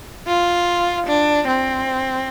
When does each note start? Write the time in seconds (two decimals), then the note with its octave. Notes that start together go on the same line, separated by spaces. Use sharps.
0.27 F4
1.07 D4
1.47 C4